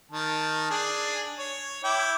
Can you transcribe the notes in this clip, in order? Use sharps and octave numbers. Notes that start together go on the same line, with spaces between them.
D#3 A5
D4 G#4
C#5
E4 G5 D6